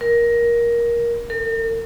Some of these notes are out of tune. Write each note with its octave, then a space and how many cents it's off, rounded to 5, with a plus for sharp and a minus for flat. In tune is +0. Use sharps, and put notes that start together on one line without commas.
A#4 +15
A#4 -45